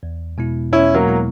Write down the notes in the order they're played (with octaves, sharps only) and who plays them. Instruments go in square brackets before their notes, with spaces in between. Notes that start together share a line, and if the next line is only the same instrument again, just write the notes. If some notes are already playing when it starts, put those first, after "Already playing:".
[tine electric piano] E2
B2 G#3 B3 E4
[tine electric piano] E2 [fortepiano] C#4 E4
[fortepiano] F#3 A#3
[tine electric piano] B2 G#3 B3 E4